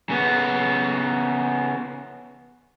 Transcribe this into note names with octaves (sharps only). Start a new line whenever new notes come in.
C#3 B3